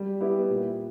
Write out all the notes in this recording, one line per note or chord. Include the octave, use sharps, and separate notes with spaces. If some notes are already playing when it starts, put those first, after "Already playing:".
Already playing: G3
B3 E4 G4
A#2